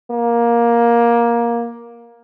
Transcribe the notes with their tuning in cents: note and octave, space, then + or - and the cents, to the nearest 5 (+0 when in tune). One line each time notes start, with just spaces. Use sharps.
A#3 +15